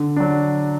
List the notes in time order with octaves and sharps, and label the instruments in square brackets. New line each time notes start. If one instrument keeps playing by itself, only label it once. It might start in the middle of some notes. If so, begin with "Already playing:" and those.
Already playing: [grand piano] D3
F#3 D4